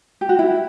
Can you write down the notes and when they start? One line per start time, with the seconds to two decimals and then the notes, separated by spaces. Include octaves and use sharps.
0.21 G4
0.29 F#4
0.39 E4